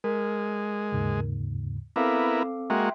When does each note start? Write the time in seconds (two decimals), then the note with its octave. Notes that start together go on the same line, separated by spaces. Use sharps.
0.04 G#3 A#4
0.92 D#2 G#2 C#3
1.96 B3 C4 E4 A4 A#4 F5 D6
2.70 G#3 A#3 F#4 E5 G5 C6